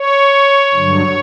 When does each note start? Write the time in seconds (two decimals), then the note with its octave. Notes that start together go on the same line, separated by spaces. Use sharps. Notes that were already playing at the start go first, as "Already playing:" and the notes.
Already playing: C#5
0.74 G2 D3 F#3